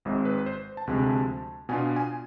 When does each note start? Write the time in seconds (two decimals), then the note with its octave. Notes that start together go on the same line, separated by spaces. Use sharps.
0.05 G#1 G#2 G#3 C4
0.25 B4
0.46 C5
0.77 A5
0.87 D2 C3 F3 G#3 C4
1.69 B2 B3 D4 F4 G#5
1.96 G#5